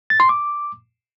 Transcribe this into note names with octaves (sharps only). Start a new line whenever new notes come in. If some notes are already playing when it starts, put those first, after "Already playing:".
A6
C6
D6